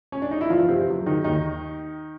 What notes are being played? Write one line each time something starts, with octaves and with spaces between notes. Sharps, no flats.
C#4
D4
D#4
E4
E2 F3 F4
C3 C4
C#3 F#3
D#3 D#4
D#2 D#3 D#4